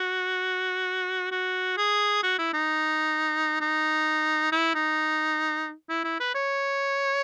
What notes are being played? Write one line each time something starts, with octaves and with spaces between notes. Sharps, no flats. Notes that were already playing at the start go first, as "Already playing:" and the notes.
Already playing: F#4
F#4
G#4
F#4
E4
D#4
D#4
E4
D#4
E4
E4
B4
C#5